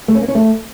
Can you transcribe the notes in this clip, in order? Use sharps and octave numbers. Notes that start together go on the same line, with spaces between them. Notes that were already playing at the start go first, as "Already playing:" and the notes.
A3
C#4
A#3
C#4
A3